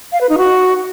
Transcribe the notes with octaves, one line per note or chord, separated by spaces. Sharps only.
F5
B4
D#4
F#4